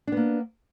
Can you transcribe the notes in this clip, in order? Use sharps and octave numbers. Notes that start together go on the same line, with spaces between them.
A#3 B3 D4